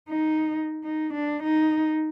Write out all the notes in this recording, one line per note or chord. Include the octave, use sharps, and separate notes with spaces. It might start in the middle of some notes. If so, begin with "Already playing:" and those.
D#4
D#4
D4
D#4